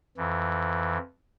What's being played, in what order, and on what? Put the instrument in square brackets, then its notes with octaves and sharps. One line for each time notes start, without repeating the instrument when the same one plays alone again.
[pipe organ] F2 E3